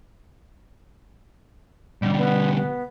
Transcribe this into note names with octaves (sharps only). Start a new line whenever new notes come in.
B2 D3 G3
B3
B3